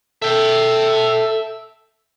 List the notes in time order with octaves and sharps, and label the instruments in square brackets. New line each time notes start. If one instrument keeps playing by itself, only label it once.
[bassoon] A4 [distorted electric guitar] E5 G5